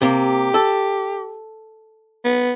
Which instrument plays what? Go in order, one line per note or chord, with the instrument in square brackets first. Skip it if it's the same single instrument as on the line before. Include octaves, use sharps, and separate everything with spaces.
[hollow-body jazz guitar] C3 A#3 [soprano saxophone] G4
[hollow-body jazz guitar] A4
[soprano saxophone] B3